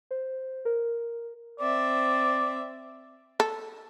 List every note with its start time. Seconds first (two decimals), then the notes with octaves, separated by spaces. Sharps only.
0.11 C5
0.65 A#4
1.60 C4 D5 E5
3.40 A4